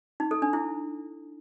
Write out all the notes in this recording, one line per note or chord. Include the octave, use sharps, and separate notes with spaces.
D#4
A4
D4
E4